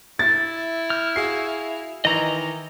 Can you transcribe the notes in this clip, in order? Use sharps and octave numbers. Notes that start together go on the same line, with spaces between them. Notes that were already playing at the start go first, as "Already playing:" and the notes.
E4 A6
F6 G6
F#4 G#4 F5 C7
D#3 E3 D#5 A#5